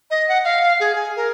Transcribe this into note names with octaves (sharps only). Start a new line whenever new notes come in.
D#5
F#5
F5
G#4
G#5
A#4